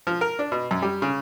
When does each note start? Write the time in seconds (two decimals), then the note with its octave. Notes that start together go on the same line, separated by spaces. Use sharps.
0.07 F3
0.21 A#4
0.39 D4
0.52 B2
0.71 F#2
0.82 G3
1.02 C#3